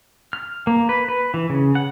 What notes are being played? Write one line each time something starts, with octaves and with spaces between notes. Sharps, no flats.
F6
A#3
B4
B4
E3
C#3
F#5